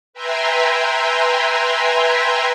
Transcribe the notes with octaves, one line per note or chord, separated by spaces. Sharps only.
B4 E5 G5 G#5 A#5 C6